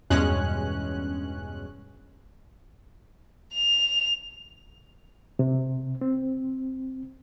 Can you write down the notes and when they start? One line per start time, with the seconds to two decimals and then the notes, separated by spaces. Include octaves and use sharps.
0.10 E2 G2 B2 G#3 C#4 F#6
3.54 F7
5.39 C3
6.01 C4